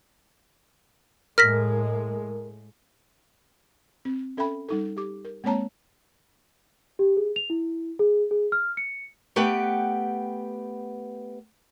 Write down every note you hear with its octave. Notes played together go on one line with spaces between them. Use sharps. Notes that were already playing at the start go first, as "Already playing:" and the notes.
A2 G#3 A#4 F6 A#6 B6
C4
C#4 A4 E5 G5 B5
G3 D#4 A4
G4 D6
A#4
G#3 A#3 C4 C#5 A5 A#5
G4
G#4
F7
E4
G#4
G#4
F6
C#7
A3 B3 G4 B4 F#5 G5